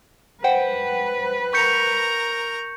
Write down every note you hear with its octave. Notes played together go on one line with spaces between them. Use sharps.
B4 C5 F#5 G5
A#4 A#5 C#6 G6 C#7